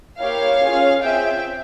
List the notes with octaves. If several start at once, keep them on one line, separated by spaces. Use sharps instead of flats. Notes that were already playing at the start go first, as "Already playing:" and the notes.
A#3 E4 G4 C#5 F5
C#4 F4 G#4
C4 F4 G#4 E5 G5